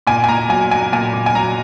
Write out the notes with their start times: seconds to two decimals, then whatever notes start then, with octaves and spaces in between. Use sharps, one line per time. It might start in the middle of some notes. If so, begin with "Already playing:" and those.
0.07 A#2 G#5
0.24 G#5
0.28 A#2 A#5
0.49 F#3 G#5
0.71 F#3 G#5
0.93 A#2 G#5
1.13 A#2
1.26 G#5
1.35 F#3 A#5